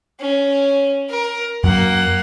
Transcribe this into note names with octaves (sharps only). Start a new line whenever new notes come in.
C#4
A#4
F#2 F#3 A#3 F#5